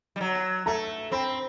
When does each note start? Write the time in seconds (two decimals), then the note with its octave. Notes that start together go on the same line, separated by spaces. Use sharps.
0.16 G3
0.21 F#3
0.66 A3 A#5
1.12 C4 B5